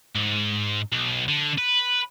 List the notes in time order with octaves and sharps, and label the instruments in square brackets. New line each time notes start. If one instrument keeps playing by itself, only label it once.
[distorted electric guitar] G#2
B1
D3
B4